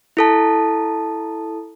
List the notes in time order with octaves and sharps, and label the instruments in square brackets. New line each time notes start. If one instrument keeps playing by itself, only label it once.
[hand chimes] E4 A4 A5